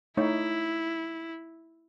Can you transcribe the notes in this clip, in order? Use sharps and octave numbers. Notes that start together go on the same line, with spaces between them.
A3 D#4 E4 C#5